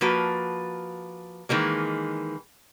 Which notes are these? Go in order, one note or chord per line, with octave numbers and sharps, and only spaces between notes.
F3 A#3 F#4 B4
D#3 E3 G#3 A#3